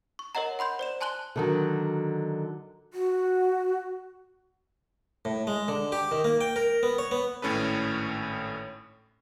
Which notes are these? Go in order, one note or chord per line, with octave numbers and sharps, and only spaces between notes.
C#6
A#4 C#5 D#5 F#5 A#5
F#5 B5 C6 G6
C5 D5 E7
G#5 A5 C6 F#6 F#7 G7
D3 D#3 F#3
F#4
A2
G#3
D3
G4
D#3
A#3
G5
A#4
B3
C#5
B3
G#1 A2 C#4 A4 B4